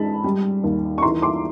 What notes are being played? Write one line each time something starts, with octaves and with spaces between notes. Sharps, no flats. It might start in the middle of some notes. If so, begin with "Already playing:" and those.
Already playing: G#2 G#3 A5 B5
G3
D#2
C#6
E3 A#5 C6
C6 D6